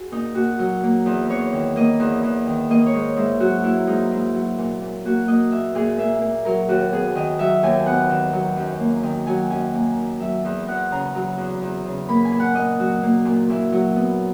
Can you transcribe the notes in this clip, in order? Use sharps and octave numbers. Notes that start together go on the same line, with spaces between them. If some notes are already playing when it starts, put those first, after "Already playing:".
Already playing: F#4 G#4
A#2 D#4
A#2 F#4
F#3
A#3
E2
E2 C#5
D#3
A#3 D#5
E2
E2
D#3
A#3 D#5
C#5
G#2
G#2 E4
F#3 F#4
A#3 E4
G#2 D#4
G#2 E4
F#3
A#2
A#2
A#3 F#4
A#3 D#5
A#2 E5
A#2 G#4
A#3 E5
A#3
F#3 A#4
D#2 F#4
B3 G#4
D#3 D#5
F#3 E5
D#2 G#5
B3 F#5
D#3
F#3
F#2
A#3
D#3
F#3 G#5
F#2 G#5
A#3
D#3
F#3 E5
E2
E2 F#5
C#3 A#5
F#3 A#5
E2
E2
C#3
A#3 B5
G#5
A#2
F#5
A#2 D#5
F#3 F#4
A#3
A#2
A#2 E4
F#3
B3